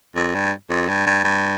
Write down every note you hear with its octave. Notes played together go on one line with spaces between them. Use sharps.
F2
G2
F2
G2
G2
G2